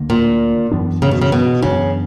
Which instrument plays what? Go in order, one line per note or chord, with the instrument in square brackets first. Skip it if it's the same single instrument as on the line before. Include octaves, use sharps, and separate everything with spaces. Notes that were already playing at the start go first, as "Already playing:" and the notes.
Already playing: [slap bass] D2 D3 A#3
[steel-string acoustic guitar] A#2
[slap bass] F#2 E3 B3 D4
[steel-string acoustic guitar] C#3
B2
C#3
B2
[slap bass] F#2 E3 B3 D4 [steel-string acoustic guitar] C#3